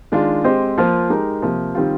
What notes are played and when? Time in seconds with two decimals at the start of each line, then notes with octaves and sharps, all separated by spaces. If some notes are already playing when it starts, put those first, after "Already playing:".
0.12 D#3 G#3 D4 F4
0.44 G#3 C4 G4 C5 D#5
0.78 F3 A#3 F4 C5
1.10 G#3 D#4 G4 A#4
1.42 C3 F3 A#3
1.75 D#3 G3 C4 F4